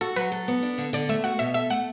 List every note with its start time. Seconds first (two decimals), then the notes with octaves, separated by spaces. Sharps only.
0.01 F#4 A4
0.16 F#3 B4
0.32 A4
0.48 B3
0.63 D4
0.78 D3
0.93 D3 D5
1.09 A3 E5
1.24 F#4 F#5
1.39 B2 E5
1.54 A4 E5
1.70 A3 F#5